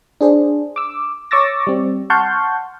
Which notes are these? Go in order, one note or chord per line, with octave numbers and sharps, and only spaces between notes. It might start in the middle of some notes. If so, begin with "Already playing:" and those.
D4 G#4 C5
D6 E6
C#5 C#6 D6 E6 A6 A#6
G3 C4
F#5 A5 C6 C#6 F6 G6